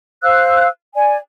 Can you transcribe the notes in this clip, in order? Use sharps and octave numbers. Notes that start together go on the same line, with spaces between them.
C5 F5 E6 F#6
D5 G#5